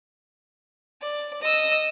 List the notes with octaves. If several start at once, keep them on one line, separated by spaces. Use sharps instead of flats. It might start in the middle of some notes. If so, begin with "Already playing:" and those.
D5
D#5 E6